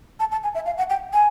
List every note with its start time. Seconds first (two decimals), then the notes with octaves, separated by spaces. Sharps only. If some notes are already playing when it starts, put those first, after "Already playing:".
0.20 A5
0.32 A5
0.43 G#5
0.55 E5
0.66 F5
0.78 F#5
0.90 G5
1.13 G#5